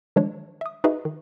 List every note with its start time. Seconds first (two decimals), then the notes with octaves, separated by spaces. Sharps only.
0.16 D#3 F3 G3 G#3 D4 C#5
0.61 E5 D#6
0.84 D#4 F#4 G#4 B4 D#5 E5
1.05 D#3